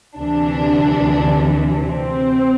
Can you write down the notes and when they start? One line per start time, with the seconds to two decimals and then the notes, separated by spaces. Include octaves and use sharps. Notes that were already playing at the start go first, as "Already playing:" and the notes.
0.18 D2 C3 E3 D4
1.83 C4